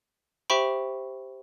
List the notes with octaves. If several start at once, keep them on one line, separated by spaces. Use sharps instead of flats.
G4 C5 E5 G5 B5 C#6